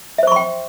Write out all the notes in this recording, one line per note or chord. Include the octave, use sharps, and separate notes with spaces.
C5 E5 G5 C6 C#6